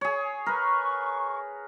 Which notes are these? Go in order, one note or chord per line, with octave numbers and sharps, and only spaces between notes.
G#4 C#5
A#4 B4 C#6